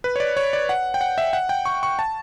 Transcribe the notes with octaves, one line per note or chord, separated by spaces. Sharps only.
B4
C#5
D5
C#5
D5
F#5
G5
F#5
E5
F#5
G5
C#6
C#6
A5